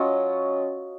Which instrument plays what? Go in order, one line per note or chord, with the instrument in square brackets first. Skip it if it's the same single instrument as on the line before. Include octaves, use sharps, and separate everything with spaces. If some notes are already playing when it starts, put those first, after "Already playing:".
Already playing: [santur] F#3 C#4 F4 D#5